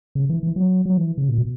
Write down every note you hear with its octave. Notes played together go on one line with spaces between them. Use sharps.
C#3
E3
E3
F#3
F#3
E3
C#3
A#2
B2